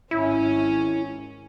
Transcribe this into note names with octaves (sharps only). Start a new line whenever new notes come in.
G#1 C#4 E4